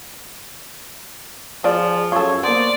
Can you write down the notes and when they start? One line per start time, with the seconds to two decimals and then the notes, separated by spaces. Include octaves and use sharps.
1.64 F3 F4 G#4 C#5 D5
2.12 F#2 F4 A4 C#5
2.43 A#3 B3 C5 D5